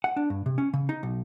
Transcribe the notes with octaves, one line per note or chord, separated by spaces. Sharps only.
F#5
D4
G2
C3
C#4
C#3
D#4
B1